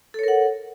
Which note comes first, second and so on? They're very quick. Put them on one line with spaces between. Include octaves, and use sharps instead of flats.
A4 C#5 A#4 F#5